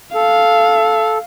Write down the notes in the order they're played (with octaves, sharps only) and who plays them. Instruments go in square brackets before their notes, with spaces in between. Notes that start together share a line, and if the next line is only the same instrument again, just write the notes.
[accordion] A4 [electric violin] F5